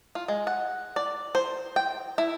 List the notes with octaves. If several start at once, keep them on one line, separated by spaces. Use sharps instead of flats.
F4
G#3
F#5
D5
C5
G5
E4